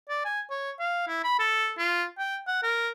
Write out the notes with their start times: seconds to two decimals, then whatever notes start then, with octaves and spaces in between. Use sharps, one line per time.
0.09 D5
0.25 G#5
0.50 C#5
0.80 F5
1.08 E4
1.24 B5
1.39 A4
1.79 F4
2.19 G5
2.47 F#5
2.63 A#4